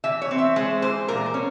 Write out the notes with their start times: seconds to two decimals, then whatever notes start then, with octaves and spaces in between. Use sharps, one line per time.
0.04 E3 E5
0.22 C#5
0.31 C4
0.38 E5
0.56 G#3 C5
0.82 E3 C5
1.08 A#2 A#4
1.26 C5
1.34 C#4